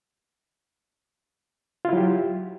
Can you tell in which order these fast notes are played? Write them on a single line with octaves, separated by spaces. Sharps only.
F4 E4 F#3 G4